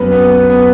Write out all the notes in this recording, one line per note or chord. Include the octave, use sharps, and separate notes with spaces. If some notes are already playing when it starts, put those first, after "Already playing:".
Already playing: F#2 B3 B4
B3
B3